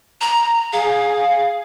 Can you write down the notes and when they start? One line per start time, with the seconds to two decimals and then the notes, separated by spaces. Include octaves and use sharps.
0.21 A#5
0.73 G#4 F5